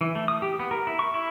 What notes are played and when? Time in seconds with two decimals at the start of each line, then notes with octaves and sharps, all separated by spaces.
0.01 E3
0.15 A3
0.28 D#6
0.42 G4
0.59 B3
0.71 A#4
0.87 E4
0.99 C#6
1.14 E4